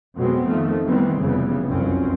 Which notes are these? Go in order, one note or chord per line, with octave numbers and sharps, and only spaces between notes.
F2 B2 F#3 G#3 B3 C4
F2 D#3 F3 A3
D#3 E3 G3 B3 C4
F1 C#3 E3 G3 B3
F1 C2 F#2 F3 C4 C#4